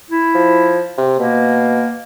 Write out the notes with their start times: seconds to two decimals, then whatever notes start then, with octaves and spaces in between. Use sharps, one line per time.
0.11 E4
0.35 F3
0.98 C3
1.20 B2 A#3